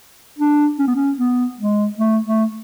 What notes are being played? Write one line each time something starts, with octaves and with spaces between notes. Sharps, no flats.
D4
C#4
B3
C#4
B3
G#3
A3
A3